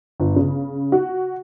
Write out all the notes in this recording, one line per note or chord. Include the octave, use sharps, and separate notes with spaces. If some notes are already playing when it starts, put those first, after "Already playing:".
G1
C#3
F#4